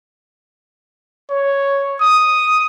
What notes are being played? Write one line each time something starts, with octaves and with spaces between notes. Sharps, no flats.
C#5
D#6